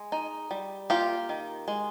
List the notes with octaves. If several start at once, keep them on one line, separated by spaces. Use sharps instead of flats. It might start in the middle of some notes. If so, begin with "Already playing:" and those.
Already playing: G#3
D#4
G3
A#3 F4 G4
D#3
G#3